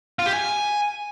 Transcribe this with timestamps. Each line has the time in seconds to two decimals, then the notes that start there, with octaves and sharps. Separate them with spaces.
0.19 F4
0.26 G4
0.33 G#5